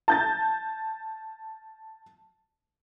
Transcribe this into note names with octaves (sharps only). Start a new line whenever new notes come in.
A5 G6 A6